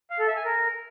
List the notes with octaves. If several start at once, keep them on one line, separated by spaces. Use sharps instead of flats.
F5
A4
E5
G#5
A#4